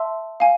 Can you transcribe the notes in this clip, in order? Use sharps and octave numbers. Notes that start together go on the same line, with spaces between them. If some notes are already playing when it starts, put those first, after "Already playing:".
Already playing: E5 A5 C6 E6
F5 G#5